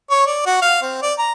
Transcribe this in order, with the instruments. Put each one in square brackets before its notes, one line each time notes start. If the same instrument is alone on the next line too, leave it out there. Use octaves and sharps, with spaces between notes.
[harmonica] C#5
D5
F#4
F5
C4
D5
A#5